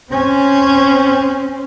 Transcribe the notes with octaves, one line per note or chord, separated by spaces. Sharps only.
C4 C#4